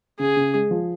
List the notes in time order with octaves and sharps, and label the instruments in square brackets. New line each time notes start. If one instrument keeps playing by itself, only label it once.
[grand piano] C#3 [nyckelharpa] G#4
[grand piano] C#3
G#3
F3